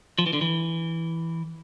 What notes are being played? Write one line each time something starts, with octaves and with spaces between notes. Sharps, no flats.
F3
E3
D3
E3